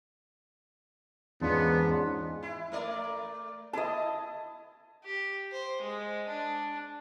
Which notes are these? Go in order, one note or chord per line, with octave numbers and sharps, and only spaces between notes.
E2 G#2 B3 C#4 D4 F4
E4
A3 A#4 D5
E4 D#5 A5
G4
C5
G#3
D4